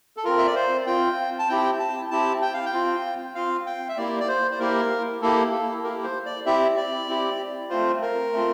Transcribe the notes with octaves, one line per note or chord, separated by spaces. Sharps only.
A4
C4 F4 A#4
E5
D5
C5
C4 F4 G5
A5
C4 E4 G4 G5
A5
C4 E4 G4 A5
G5
F5
G5
C4 F4
C4 F4 F5
G5
E5
A#3 E4 G4 D5
D5
C5
C5
A#3 E4 G4 A#4
A#3 E4 G4 A4
A4
A#3 E4 G4 A#4
C5
D5
C4 E4 G4 E5
D5
C4 E4 G4
A3 C4 F4 C5
A#4
A3 C4 F4